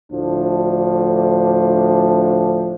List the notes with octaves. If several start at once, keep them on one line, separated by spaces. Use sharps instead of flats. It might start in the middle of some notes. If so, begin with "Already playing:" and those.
D2 A2 F3 D4